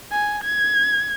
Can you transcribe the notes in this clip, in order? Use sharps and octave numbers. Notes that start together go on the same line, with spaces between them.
G#5
G#6